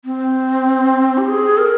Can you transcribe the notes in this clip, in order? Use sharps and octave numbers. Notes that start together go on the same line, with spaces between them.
C4
G4
G#4
A#4